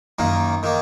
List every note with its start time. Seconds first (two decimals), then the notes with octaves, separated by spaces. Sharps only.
0.19 F#2 D#3 A#3
0.63 D#3 A#3